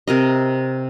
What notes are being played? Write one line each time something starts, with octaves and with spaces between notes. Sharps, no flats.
C3 A#4 D#5